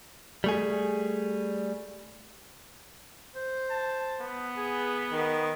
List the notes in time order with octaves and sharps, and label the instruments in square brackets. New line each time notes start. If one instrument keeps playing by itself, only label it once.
[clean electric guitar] G3 A3 G#4
[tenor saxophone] C5
[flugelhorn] A5
B3
[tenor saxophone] G#4
D#3